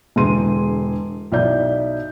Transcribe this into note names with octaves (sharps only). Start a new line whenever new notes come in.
E1 D3 E3 G#4 C6 D#7
B1 E4 D5 G6